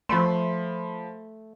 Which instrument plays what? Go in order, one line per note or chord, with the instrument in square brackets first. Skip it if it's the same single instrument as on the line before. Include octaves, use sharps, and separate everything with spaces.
[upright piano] F3 B5 C6 [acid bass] A3